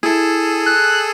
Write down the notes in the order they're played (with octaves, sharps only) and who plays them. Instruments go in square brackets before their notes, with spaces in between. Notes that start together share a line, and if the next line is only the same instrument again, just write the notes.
[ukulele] E4 [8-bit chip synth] G#4 A4
[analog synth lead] F#6